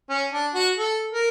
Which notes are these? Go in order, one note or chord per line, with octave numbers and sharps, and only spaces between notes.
C#4
D4
F#4
A4
A#4